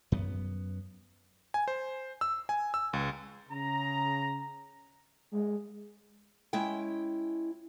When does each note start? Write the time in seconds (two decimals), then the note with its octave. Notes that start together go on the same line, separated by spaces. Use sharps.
0.12 F#2 B3
1.54 G#5
1.68 C5
2.21 E6
2.49 G#5
2.74 E6
2.93 C#2
3.51 C#3 A#5
5.32 G#3
6.53 G#3 C#4 E4 G5